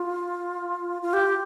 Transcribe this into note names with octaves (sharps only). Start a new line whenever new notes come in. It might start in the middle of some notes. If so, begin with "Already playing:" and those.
Already playing: F4
F4
G4